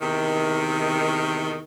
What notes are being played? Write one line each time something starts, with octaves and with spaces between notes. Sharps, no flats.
E2 C3 D#3